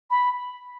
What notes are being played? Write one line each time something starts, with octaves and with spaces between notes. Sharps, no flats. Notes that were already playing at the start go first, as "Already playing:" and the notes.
B5